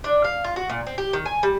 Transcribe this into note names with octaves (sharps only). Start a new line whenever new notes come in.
D4
F5
F4
F#4
A#2
C4
G4
D#3
G#5
G3